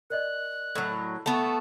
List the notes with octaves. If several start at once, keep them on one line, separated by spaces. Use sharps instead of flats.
A#4 D5 D#5 F#6
A2 F#3
A3 B3 F#5 A5 C#6